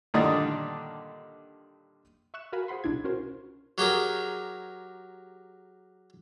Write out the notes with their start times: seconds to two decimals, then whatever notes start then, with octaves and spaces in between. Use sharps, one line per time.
0.14 G2 A#2 D3 D#3 D4 D#4
2.34 E5 C#6 F#6 E7
2.52 F#4 A#4 F5 G#5 A#5 B5
2.68 G#4 C5 F#5 B5 C6
2.84 C2 B2 D4 E4 G#6
3.04 C#4 F4 F#4 A#4 C5
3.78 F#3 G4 G#4 A#4